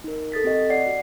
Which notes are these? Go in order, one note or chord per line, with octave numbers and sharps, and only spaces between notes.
D#4 A#4
A4 D#6 A6 B6
C4 G4 D#5
D5 F#5 C7
F#4